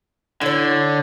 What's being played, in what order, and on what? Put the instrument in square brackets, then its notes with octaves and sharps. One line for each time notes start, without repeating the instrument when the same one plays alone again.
[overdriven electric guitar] D3 [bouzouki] E4 C#5